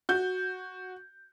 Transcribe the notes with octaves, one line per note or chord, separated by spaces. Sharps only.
F#4 G6